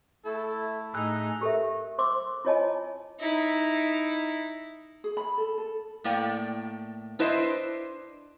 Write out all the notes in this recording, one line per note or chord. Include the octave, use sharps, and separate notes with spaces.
A3 E4 A4
A2 D#4 G#4 E6 F#6
G4 A4 A#4 E5
C5 C6 D6 E6
E4 F4 C#5 D#5 G#5 A5
D#4 E4
G#4
B5
A4
A4
A2 A3 A#3 D5 G5
D4 E4 B4 C5 D#5 E5